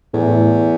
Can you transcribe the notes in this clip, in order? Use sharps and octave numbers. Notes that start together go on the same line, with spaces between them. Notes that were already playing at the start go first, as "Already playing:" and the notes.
E2 A2